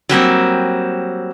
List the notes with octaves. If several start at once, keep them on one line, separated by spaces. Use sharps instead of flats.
F#3 G3 A#3 C4